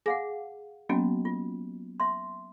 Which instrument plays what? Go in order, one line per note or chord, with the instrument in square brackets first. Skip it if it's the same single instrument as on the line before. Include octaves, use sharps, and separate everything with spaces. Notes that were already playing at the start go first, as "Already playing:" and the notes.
[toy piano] G#4 F5 F#5 [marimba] G#5 D6 A#6
[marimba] F#3 A#3 B3 [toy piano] C#4 F#4 D#5
[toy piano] F4
E5 C6